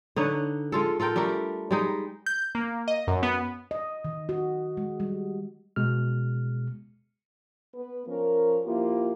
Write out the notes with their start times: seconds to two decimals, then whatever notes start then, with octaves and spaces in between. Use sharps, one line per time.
0.16 D3 D#4 B4 C#5
0.72 G#3 F4 A4
1.00 F4 A4 A#4 G5
1.16 G3 A3 D4 A#4
1.71 G3 G#3 D#4
2.26 G6
2.55 A#3
2.88 D#5
3.07 F#2
3.23 B3
3.71 D#5
4.05 D#3
4.29 F#4
4.77 G#3
5.00 G3
5.76 B2 G#3 F6
7.75 B3 B4
8.08 F3 C#4 A#4
8.66 F3 A#3 E4 F4 G4